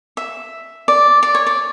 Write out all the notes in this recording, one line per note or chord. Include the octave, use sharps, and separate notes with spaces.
E5
D5
D5
C#5
D5